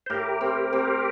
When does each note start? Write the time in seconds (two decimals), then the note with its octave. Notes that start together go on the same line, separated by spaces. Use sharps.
0.06 C5
0.10 A2 G4 A#4
0.41 C4
0.73 C4